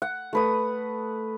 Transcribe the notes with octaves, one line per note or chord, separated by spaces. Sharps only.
F#5
A3 B4 D#6